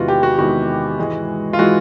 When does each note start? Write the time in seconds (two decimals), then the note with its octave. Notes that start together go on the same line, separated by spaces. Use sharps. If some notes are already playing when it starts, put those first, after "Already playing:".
Already playing: E2 C3 D#3 G#3 B3 F4 F#4
0.08 G4
0.23 F#4
0.38 E2 C3 D#3 G#3 B3 F#4
0.99 G#2 E3 G#3
1.53 F4
1.59 E3 G#3 F#4